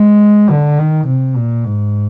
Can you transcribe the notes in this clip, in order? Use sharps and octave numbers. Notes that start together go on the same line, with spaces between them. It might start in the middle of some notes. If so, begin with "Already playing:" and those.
Already playing: G#3
D3
D#3
C3
A#2
G#2